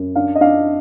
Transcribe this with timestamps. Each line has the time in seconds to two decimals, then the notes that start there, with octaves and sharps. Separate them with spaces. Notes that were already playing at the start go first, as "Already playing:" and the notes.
Already playing: F#2
0.15 D4 F5
0.35 D#5
0.41 D4 F5